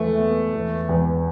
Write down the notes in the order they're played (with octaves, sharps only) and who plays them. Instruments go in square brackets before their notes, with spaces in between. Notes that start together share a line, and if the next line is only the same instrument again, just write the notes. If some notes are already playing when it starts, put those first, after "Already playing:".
Already playing: [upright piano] E2 E3 [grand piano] A3
[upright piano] B3
E2
E2